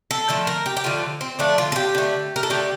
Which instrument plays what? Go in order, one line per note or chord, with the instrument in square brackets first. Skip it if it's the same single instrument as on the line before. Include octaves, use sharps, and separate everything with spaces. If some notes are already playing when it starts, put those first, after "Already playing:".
[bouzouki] A4
D3 F3 A3
A#4
G4
G4
D3 F3 A3 F4
C4
D3 F3 A3 D4
F4
A4
G4
D3 A3
A#4
A4
D3 A3 G4